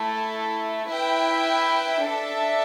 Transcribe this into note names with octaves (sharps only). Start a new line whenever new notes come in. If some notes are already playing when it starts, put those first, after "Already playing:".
Already playing: A3 E4 A4
E4 B4 E5 G5
D4 A4 E5 A5